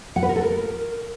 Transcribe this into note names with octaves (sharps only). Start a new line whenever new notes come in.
F#5
B4
A#4
A4
A#4